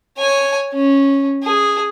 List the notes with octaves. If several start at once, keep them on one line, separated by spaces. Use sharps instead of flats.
C#5 G#5
C#4
G#4